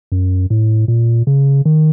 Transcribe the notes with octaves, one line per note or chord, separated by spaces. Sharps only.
F#2
A2
A#2
C#3
D#3